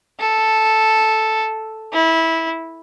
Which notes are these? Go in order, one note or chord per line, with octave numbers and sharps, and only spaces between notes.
A4
E4